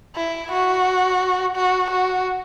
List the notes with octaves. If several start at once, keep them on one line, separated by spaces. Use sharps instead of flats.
E4
F#4
F#4
F#4